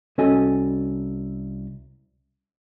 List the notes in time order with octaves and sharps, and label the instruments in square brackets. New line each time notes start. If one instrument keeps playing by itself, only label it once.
[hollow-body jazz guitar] C2 C#4 F#4 A4 D#5 G#5